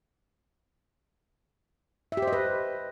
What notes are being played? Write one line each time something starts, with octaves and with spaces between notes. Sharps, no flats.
E5
G4
C5
D#5
B4